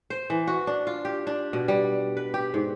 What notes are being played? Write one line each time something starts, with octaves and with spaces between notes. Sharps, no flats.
C5
E3
F#4
D4
F4
G4
D4
B2
G3
B4
G4
G#2